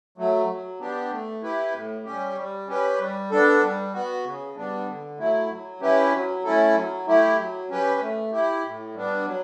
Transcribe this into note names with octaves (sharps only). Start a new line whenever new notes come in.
F#3 A3
F#3
B3 D4 G4
A3
E4 G4 B4
A2
G3 C#4 G4
G3
C#4 G4 B4
G3
B3 D4 A4
G3
B3 F#4
C#3
G3 B3 D4
D3
F#3 A3 E4
F#3
C#4 E4 G4 B4
F#3
A3 C#4 E4 A4
F#3
A3 E4 G4
F#3
C#4 G4 B4
A3
E4 G4
A2
G3 B3 D4
F#3